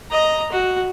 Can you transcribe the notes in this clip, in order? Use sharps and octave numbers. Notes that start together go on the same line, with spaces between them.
D#5 A#5
F#4